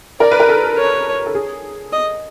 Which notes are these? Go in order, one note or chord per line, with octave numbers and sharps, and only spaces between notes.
A#4 D5
B4
A#4
A4
C#5
A4
G#4
D#5